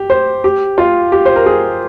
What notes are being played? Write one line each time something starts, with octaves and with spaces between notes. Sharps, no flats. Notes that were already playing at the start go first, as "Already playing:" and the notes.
Already playing: G4
C5
G4
F4
G4
C5
A#4
G#4